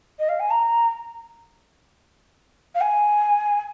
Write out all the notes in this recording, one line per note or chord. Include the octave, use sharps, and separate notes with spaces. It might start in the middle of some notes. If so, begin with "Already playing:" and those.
D#5
F5
G#5
A#5
F5
G#5